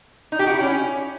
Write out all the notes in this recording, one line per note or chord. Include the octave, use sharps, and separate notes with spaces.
D#4
G4
F#4
E4
C#4